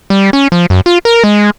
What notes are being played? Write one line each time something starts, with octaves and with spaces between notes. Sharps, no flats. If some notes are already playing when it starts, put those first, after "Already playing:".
G3
C#4
F3
F#2
F4
A#4
G#3